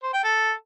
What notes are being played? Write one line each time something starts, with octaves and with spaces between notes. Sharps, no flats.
C5
G5
A4